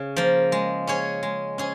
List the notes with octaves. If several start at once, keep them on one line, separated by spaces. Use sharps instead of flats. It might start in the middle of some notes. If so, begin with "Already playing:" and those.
Already playing: C#3
F3 A#3
G#3
C#4 G#4 C#5
G#3
C#4 G#4